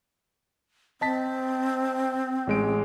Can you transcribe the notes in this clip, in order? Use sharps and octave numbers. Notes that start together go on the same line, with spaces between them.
C4 D#5 A5 B6
A1 G#3 D7